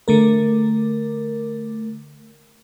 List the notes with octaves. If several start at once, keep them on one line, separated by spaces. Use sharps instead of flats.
D3 A3 A#4